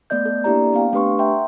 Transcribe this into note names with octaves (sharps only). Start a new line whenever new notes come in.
A3 B3 D5 D#5 G6
A4
A#3 D4 E4 G4 D5 A#5
B3 C4 F5 G5
A3 D4 G4 B4 C6 C#6
E5 F#5 G5 A#5 C6